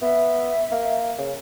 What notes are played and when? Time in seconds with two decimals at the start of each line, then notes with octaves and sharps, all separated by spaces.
0.02 B3 E5
0.72 A#3
1.18 C#3